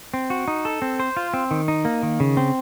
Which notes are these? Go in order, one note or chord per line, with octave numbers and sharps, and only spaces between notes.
C4
F#4
D#4
A4
C4
C5
F4
C4
D#3
D#4
A#3
D#3
C#3
C4